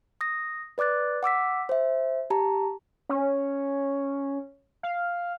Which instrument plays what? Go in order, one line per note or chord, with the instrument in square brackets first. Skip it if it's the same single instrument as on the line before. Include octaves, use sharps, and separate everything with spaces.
[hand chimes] D#6 A#6
B4 D5 D6 F#6 A6
F#5 D6 E6 B6
C5 E5
G4 A5 A#5
[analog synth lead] C#4
F5